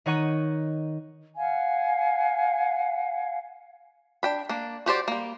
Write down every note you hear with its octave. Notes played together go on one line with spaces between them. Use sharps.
D#3 D#4 C#5 F#5 C#6 D#7
F5 F#5 G#5
D4 G5 B5
A#3 D4
F#4 G4 C5 D5
G3 A#3